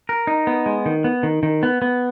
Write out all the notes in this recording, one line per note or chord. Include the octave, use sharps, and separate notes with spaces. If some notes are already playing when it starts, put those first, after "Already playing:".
A#4
D#4
B3
G#3
D#3
B3
D#3
D#3
B3
B3